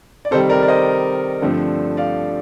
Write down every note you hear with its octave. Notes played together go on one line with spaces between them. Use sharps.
D5
C3 D#3 G3 A4 C5
A#4 D5
D5
C5 D#5
G2 D3 F3 A3 C4
D5 F5